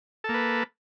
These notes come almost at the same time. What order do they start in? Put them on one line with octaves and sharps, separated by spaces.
A4 A#3 B4